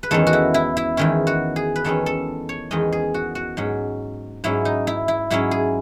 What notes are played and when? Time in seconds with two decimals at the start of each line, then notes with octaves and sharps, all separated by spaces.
0.03 B4
0.11 E2 D#3 G#3 C#4 A4
0.27 F#4
0.33 E4
0.54 E4
0.77 E4
0.97 E2 D#3 G#3 C#4 E4
1.27 F#4
1.56 G#4
1.76 B4
1.84 E2 D#3 G#3 C#4 A4
2.06 A4
2.49 C#5
2.71 E2 D#3 G#3 C#4 D#5
2.92 G#4
3.14 F#4
3.35 F#4
3.57 G#2 F#3 C#4
4.44 G#2 F#3 C#4 E4
4.65 D#4
4.87 E4
5.08 E4
5.30 G#2 F#3 C#4 E4
5.51 G#4